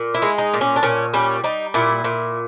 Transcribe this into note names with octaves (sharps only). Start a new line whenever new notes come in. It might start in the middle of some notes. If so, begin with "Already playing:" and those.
Already playing: A#2
E4
G#3
D#4
A#2
C#4
D4
A#2 C#4
G3 C#4
G3 D#4
A#2 E4
A#2